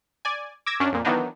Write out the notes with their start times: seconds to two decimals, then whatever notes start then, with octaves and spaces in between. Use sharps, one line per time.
0.25 D5 G#5
0.66 D6 E6 G#6 A#6
0.80 F#2 C#4 D4
0.92 F2 A#2
1.05 D#3 E3 F#3 B3 D4 D#4